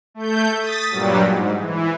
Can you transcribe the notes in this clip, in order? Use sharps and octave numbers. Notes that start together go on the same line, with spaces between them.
A3 G6
D#6 A6 B6
G2 A#2 F#3 G3
G#2
E3